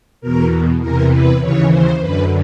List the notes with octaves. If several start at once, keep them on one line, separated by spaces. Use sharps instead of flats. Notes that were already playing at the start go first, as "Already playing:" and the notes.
E2 B2 A#4
E2 C3 E3 A#4
B4
D#2 C#3 E3 C#5
C5
F#2 D3 B4